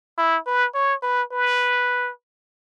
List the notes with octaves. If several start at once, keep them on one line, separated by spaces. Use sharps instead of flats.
E4
B4
C#5
B4
B4